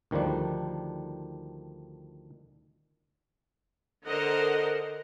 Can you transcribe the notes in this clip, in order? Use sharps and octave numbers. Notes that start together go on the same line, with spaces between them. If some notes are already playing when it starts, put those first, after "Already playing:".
D2 D#3 F3 G3 D4
D3 A#4 C5 D#5 F#5 A#5